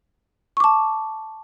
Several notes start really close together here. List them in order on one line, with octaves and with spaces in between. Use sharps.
C#6 D6 A5